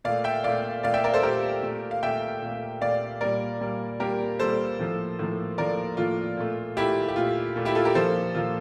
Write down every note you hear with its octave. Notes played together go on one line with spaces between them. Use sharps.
A#2 A3 D5 F5
E5 G5
A#2 A3 D5 F5
A#2 A3 D5 F5
E5 G5
A#4 D5
A4 C5
A#2 A3 G4 A#4
A#2 A3
F5
A#2 A3 E5 G5
A#2 A3
A#2 A3 D5 F5
A#2 G3 A#3 A#4 D5
A#2 G3 A#3
A#2 G3 A#3 G4 A#4
A#2 G3 A#3 A4 C5
A2 F3 A#3
A2 F3 A#3
A2 F3 A#3 A#4 D5
A2 F3 A#3 F4
A#2 A3
A#2 A3 E4 G4
G4
A#2 A3 F4
A#2 A3
E4 G4
F4 A4
G4 A#4
A#2 F3 A#3 A4 C5
A#2 F3 A#3 F4